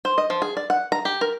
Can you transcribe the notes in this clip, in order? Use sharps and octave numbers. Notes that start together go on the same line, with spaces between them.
C5
D#5
F3
G#4
D5
F#5
A#5
G4
A#4